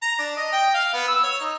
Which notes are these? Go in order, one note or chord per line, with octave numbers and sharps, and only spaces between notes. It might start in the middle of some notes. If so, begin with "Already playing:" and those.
A#5
D4
D#5
G5
F5
B3
E6
C#5
D#4